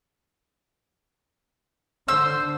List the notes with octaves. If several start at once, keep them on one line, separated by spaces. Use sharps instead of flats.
D3 C5 E6